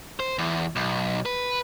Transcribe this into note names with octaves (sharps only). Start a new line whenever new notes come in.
C5
E2
B1
B4